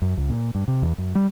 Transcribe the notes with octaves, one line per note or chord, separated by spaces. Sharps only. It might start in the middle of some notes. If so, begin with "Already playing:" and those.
F#2
C#2
A#2
G2
C3
E2
F#2
G3